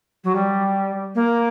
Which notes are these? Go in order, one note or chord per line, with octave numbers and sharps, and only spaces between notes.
F#3
G3
A#3